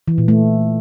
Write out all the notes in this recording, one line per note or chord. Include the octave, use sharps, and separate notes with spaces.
E3
A#2
A3